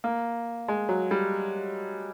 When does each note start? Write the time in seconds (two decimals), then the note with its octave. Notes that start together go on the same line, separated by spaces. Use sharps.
0.04 A#3
0.68 G#3
0.89 F#3
1.11 G3